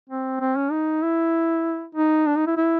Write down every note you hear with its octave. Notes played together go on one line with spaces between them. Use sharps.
C4
C4
C#4
D#4
E4
D#4
D4
D#4
E4
E4